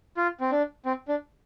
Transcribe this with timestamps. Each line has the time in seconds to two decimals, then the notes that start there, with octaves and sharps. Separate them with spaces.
0.17 F4
0.40 C4
0.52 D4
0.86 C4
1.08 D4